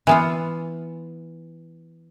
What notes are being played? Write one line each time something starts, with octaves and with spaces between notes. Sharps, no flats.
E3 B3 F4